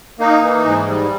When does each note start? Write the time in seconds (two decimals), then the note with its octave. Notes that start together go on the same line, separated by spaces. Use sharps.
0.19 A#3 D#4
0.42 E3
0.65 G#2
0.88 G3